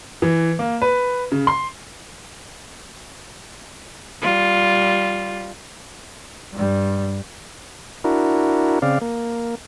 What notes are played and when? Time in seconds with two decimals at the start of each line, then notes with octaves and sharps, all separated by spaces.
0.22 E3
0.59 A#3
0.82 B4
1.32 C#3
1.47 C6
4.22 G3 F4
6.53 G2 G3
8.04 D4 E4 F#4 A#4
8.82 C#3 C4 D5 F5
9.02 A#3